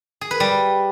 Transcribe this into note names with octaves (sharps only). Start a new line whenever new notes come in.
G#4
B4
G3